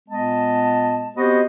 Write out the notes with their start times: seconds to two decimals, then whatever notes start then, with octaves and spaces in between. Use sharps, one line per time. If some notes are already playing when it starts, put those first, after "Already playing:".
0.09 A#2 G#3 B3 D#5 A5
1.15 B3 C4 F#4 G4 C5 D#5